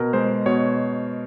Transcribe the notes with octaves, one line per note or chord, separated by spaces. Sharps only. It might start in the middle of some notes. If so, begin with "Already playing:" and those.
Already playing: B2 A#4
G#3 C5
B2 C#5